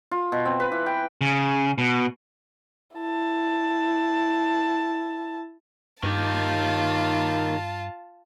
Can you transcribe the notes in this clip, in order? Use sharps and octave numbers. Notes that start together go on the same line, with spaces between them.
F4
B2
C4
B4
E3
G5
C#3
B2
E4 A5
G2 D#3 F4 G4 A5